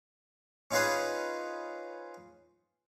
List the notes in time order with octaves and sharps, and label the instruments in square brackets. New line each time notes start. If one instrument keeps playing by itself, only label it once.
[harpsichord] C#4 D#4 F4 G#4 B4 C5